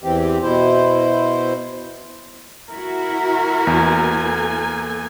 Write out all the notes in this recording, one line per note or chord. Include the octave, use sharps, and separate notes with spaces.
E2 E3 C4 G4
B2 E4 C5
E4 F#4 A#4
E2 A#3 A4 G#5